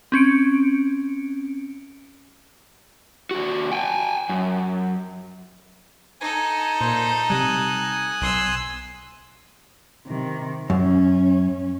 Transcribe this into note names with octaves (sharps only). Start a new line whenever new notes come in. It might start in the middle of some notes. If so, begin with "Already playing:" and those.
C4 C#4 C#7 D7
D#2 F#4
G5 G#5
F#2
D#4 A4 G#5
A#2 C5
C3 G3 G#5 D#6 F#6
B1 C6 E6
C3 D#3
F#2 C#4